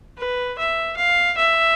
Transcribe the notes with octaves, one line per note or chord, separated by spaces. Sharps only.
B4
E5
F5
E5